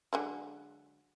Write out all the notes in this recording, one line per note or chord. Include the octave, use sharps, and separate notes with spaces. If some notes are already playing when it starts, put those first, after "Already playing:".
D3 F#3 G#3